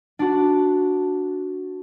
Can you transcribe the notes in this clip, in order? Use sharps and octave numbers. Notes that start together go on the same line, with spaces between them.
D4 F#4